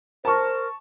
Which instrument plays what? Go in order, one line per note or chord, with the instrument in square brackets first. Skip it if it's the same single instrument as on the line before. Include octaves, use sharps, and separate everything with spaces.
[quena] A#4 [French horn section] C5 [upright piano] A5 C#6